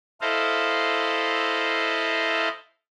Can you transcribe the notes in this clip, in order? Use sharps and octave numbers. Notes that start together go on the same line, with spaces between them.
E4 A4 C5 D#5 F5